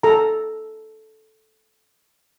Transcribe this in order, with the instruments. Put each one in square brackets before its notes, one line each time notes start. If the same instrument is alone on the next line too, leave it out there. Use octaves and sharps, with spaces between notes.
[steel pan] A4 A#5